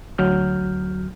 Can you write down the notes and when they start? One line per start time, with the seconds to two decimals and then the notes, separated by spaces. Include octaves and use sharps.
0.18 D2 F#3 F6 G6